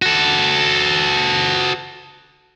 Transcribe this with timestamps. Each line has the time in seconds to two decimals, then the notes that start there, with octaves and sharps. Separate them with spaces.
0.02 F#4 A4